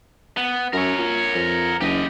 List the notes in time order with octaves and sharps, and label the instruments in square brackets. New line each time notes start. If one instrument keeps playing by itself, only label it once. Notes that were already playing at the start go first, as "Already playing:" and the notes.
[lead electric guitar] B3
[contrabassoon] F#2 [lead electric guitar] A#4 C#5
[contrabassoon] A#2
F2
[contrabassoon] F#1 [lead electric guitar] G4 D#5